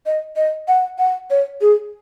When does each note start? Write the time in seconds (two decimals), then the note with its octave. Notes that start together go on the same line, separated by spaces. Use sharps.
0.06 D#5
0.36 D#5
0.68 F#5
0.98 F#5
1.30 C#5
1.61 G#4